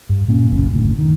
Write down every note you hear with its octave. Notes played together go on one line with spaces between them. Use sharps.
G2
A#2 A#3 C#4
F#1 B1 C#4
F#1 D2 A2
D#3